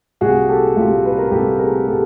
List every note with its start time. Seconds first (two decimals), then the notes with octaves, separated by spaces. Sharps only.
0.21 C2 A#2 G3 F#4 G#4
0.48 G4 A4
0.76 C2 A#2 G3 F4 G4
1.05 B4
1.18 A#4
1.31 C2 A#2 G3 G4 A4
1.59 G#4 A#4
1.87 A#2 G3 G4 A4